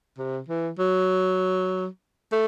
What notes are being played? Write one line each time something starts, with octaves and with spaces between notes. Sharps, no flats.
C3
E3
F#3
A3